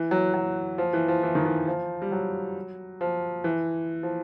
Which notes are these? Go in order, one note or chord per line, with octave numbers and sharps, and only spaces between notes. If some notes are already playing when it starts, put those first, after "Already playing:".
Already playing: E3
F#3
F#3
F3
E3
F3
E3
D#3
E3
F3
G3
F#3
F3
E3
F3